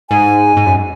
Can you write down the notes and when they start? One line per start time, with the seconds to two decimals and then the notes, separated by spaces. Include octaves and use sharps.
0.10 G#2 G#5
0.57 G#2
0.66 F#2